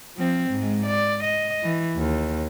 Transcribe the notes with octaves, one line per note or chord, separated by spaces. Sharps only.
F3 C4
G#2 G#3
D5
D#5
E3
D#2